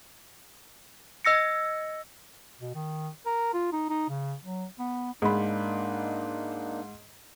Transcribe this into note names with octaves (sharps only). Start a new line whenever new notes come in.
D#5 E6 A#6 C#7
B2
D#3
A#4
F4
D#4
D#4
C#3
F#3
B3
G#2 A#3 D4 D#4 B5